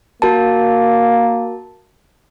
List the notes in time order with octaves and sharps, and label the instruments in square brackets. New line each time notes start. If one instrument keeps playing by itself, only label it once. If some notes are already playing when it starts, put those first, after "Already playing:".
[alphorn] A#3 [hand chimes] F#4 A#4 A5